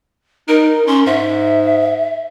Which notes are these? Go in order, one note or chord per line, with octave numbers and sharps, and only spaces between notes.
D#4 A#4
C#4 C6
G#2 E5